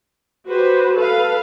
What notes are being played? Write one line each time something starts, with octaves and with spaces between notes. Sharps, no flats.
F#4 G4 B4 C5
A4 B4 F5